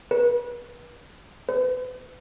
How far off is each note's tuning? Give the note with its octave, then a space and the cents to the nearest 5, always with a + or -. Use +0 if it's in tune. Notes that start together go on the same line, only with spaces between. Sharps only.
B4 -35
B4 +40